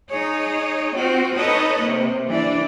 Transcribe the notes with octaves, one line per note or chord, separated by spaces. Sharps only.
D#4 G#4 C#5
C4 F4 F#4
D#4 A4 B4 C#5 D#5
C3 A#3
E3 D4 D5